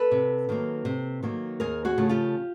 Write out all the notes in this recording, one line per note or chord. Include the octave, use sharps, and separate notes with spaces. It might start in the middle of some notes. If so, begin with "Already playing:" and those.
Already playing: A4 B4
C3
D#3 F#3 A#3
C3
D#3 F#3 A#3
D#2 G#4 A#4
F#4 G#4
C#3 F3 A3
F4 G4